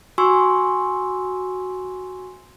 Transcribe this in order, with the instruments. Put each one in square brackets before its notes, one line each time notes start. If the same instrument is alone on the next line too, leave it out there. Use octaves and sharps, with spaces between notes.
[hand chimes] F#4 G#5 C6 C#6 E6